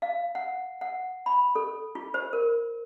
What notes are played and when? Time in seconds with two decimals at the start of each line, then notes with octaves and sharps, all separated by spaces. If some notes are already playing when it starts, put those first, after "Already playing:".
0.02 F5
0.35 F#5
0.81 F#5
1.26 B5
1.55 A4
1.95 F4
2.14 C5
2.33 A#4